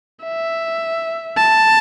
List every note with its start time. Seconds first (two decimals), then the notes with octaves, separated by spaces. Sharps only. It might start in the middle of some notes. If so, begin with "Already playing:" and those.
0.24 E5
1.37 A5